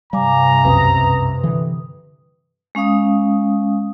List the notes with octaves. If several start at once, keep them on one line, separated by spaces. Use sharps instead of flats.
G2 C3 G3 F5 G#5 A#5 D6
C2 F#2 B2 B4 D#6
D3 E3
G#3 C#4 F5 D#6